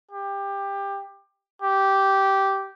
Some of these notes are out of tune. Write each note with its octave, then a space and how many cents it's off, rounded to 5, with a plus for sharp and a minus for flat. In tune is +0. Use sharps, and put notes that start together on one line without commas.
G4 +20
G4 -10